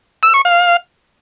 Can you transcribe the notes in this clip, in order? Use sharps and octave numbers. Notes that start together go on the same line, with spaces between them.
E6
C#6
F5